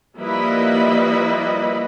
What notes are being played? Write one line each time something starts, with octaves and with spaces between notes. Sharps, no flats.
F3 G3 A#3 E4 B4 D#5